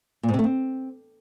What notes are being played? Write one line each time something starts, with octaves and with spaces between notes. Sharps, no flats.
A#2
G#2
C3
A3
C4